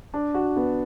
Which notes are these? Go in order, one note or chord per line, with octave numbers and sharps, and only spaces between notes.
D4
F#4
B3